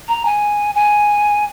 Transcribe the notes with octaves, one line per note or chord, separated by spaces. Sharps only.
A#5
G#5
G#5